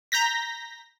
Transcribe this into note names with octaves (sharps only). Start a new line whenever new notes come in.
A#5 G6 A#6 B6